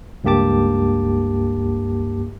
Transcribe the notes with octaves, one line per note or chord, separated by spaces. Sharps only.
C#2 G2 A#3 G4 A5 D6